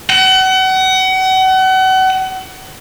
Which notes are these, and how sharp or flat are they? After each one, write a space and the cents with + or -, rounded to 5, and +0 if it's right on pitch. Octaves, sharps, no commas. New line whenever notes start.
F#5 +35